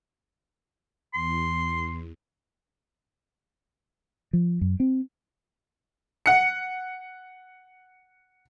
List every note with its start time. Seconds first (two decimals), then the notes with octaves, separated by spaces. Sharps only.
1.14 E2 C6
4.33 F3
4.61 F#2
4.80 C4
6.26 F#5 C#7